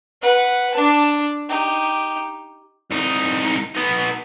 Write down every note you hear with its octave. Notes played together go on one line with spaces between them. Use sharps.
B4 F#5
D4 A5
D#4 G4
C2 D#4
B3 D#4